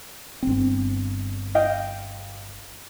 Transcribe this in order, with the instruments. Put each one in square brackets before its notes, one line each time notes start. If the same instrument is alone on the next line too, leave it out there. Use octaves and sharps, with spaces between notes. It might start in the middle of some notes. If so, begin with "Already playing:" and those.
[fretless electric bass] G1 C4
[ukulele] D#5 F5 G5